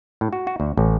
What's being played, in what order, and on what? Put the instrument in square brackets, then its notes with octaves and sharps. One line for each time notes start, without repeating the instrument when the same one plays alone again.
[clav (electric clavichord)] A2
F#4
F#4
D2
A1